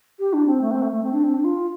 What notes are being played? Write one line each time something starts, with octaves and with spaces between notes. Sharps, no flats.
G4
D4
C4
A3
C4
A3
A3
C4
D4
C4
D4
F4